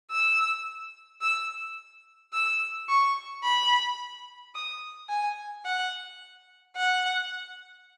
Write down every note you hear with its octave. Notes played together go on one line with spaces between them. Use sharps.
E6
E6
E6
C#6
B5
D#6
G#5
F#5
F#5